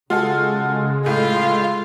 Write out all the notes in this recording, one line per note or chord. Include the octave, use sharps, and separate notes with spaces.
C#3 G#3 F4 F#4 A4
A2 F4 F5